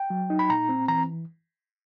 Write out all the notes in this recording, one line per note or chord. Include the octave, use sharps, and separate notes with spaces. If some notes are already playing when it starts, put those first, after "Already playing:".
Already playing: G5
F#3
D#4
B5
A#2 A#5
C4
E3 A#5